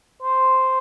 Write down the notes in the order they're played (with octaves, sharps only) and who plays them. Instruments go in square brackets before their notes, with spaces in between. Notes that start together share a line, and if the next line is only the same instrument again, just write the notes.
[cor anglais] C5